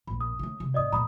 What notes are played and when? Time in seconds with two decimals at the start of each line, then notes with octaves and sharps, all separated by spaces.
0.07 A#1 A#2 B5
0.21 D#6
0.39 C#3 A3
0.60 C3 G#3
0.74 G#2 C4 D5 D#5 D#6
0.93 E2 A#2 A#5 B5 D#6